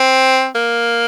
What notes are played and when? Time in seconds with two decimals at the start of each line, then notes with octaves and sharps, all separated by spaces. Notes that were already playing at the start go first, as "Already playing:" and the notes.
Already playing: C4
0.55 A#3